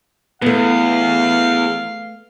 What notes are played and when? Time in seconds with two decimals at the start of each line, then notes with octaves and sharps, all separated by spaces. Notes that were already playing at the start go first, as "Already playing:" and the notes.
0.42 E2 A3 B3 F5